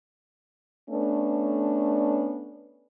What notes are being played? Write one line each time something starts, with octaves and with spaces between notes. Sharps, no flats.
A3 B3 C#4 D4